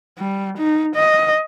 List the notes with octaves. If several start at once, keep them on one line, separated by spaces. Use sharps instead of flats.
G3
D#4
D#5